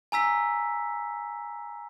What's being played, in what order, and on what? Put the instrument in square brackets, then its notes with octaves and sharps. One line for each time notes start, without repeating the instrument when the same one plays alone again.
[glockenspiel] G#5 A#5 E6 B6